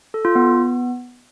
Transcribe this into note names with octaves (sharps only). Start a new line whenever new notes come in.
A4
F4
B3